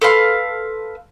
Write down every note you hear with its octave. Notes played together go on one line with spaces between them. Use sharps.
A4 B4 F5 C6